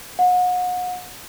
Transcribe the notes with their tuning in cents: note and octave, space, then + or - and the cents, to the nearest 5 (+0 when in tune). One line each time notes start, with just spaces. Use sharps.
F#5 -35